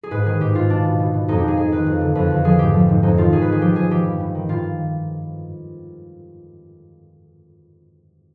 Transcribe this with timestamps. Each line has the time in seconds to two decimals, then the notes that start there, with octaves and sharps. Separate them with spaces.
0.03 G#4
0.11 G#2 B4
0.25 D#3 G#4
0.40 G#2 G4
0.55 G#2 F4
0.69 B2 D4
0.84 B2
0.99 B2
1.13 B2
1.28 F2 D#4
1.37 G4
1.43 F2 G#4
1.57 F2 G#4
1.71 D#3 B4
1.86 F2
2.01 D3
2.15 F2 B4
2.31 F2
2.44 F3 G#4
2.59 G#2 G4
2.74 F3
2.89 G#2
3.03 F2 D#4
3.17 D#3 F4
3.32 D#3 G#4
3.42 B4
3.47 D#3 G#4
3.61 F3 G4
3.76 F3 G#4
3.90 F3 G4
4.05 G2
4.20 G2
4.35 D#3
4.49 G2 F4